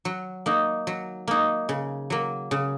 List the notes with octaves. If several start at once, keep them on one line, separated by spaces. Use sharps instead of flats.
F#3
A#3 D#4
F#3
A#3 D#4
C#3
F#3 A#3
C#3